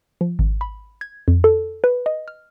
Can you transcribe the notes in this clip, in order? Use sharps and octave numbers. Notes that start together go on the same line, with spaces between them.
F3
G#1
B5
G#6
F2
A4
B4
D#5
F6